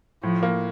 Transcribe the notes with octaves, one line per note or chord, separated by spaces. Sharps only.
A2 F3
A#3